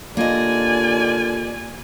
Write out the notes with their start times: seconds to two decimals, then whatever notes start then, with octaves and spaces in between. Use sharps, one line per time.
0.17 D#2 D3 A#3 F4 D5 D#5 G#5